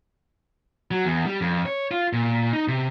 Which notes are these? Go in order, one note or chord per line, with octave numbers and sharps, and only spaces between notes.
F#3
E2
G3
F2
C#5
F4
A#2
D#4
C3